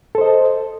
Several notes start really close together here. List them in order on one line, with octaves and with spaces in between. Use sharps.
A4 C5 D#5